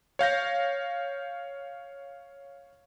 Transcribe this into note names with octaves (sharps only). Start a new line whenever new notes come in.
C#5 F5 G6 A#6